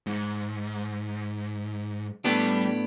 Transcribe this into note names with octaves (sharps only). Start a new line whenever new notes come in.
G#2
A2 G3 B3 D4 G4